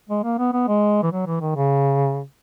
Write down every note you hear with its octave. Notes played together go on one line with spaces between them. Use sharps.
G#3
A#3
B3
B3
G#3
E3
F#3
E3
D#3
C#3